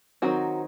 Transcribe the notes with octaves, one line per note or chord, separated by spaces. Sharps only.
D#3 F#3 C4 F#4